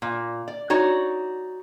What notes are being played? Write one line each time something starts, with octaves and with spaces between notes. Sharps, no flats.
A#2
D5
D#4 F#4 C#5 D5